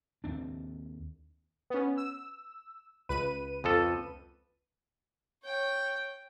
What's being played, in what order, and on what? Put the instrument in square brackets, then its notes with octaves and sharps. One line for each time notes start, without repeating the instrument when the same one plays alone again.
[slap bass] D#2 C4 D4
[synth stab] B3 C#4
E6
C#2 B4 D#7
[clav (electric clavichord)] F2 F3 A4
[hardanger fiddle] C#5 G5